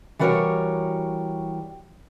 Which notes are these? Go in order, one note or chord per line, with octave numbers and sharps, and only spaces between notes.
E3 G3 F#4 A#4 C5 C#5